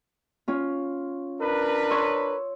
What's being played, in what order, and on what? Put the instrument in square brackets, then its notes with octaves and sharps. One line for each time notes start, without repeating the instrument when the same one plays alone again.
[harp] C#4 F4
[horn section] D4 A#4 B4
[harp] C#5 C6 E6